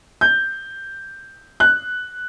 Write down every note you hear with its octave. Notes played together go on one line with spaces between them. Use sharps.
G6
F#6